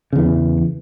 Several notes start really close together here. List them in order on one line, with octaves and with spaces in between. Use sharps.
C#3 E2 E3